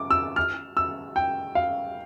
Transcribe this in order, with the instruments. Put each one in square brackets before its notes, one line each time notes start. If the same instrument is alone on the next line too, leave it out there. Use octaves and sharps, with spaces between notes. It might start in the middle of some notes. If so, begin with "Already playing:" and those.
Already playing: [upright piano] D6
E6
F6
E6
G5
F5